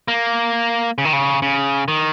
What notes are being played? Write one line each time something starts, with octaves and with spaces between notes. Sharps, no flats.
A#3
C#3
D#3
C#3
C#3
D#3